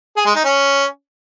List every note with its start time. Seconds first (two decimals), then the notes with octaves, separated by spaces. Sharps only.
0.17 G#4
0.26 G#3
0.35 D#4
0.44 C#4